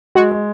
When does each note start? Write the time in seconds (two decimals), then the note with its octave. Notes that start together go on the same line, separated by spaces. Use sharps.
0.15 G#3 F#4
0.31 G#3